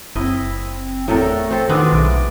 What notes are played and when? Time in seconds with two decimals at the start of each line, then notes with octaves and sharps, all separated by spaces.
0.16 F#1 C4 E4 D#5
1.08 E2 A2 A3 A4 A#4
1.51 C4 A4
1.69 B2 D3 D#3 G#3 B3 D4 F4
1.93 B1 C#3 A3 D6